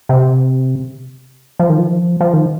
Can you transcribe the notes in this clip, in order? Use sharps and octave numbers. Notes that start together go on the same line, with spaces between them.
C3
F3
D#3
F3
F3
D#3